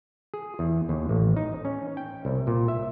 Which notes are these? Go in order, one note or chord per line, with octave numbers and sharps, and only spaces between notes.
G#4
E2
D#2
A1
D#4
C#4
G5
C2
A#2
E5